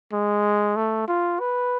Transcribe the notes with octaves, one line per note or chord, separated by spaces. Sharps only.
G#3
A3
F4
B4